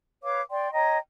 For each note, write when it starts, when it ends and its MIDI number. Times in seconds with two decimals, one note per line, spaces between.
0.23 0.40 71
0.23 0.40 73
0.23 0.40 77
0.23 0.40 86
0.50 0.71 74
0.50 0.71 79
0.50 0.71 84
0.73 0.97 73
0.73 0.97 75
0.73 0.97 79
0.73 0.97 82